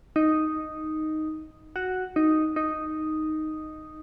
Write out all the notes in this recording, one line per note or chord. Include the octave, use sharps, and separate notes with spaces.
D#4
F#4
D#4
D#4